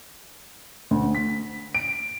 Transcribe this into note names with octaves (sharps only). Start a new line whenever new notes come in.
D2
B6
D7